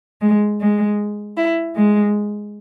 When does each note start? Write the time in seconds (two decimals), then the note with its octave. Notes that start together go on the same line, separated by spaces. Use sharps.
0.21 G#3
0.60 G#3
1.37 E4
1.76 G#3